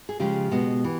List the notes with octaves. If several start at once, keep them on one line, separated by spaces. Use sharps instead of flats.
G#4
C#3 F3 G#3 G4
B2 G#3 B3
E3